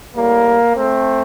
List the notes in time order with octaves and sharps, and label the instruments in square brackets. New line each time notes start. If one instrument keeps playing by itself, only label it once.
[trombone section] A2 G3 A#3
A3 C4